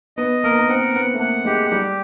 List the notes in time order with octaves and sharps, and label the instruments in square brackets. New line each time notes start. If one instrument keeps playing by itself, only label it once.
[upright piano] B3 [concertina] D#5
[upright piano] A#3 [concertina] A#4
[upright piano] B3
A#3
[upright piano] C4 [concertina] F#5
[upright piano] B3 [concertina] F#5
[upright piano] A3
[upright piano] A#3 [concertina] F#5
[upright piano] G#3 [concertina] G4
[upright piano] G3 [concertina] G4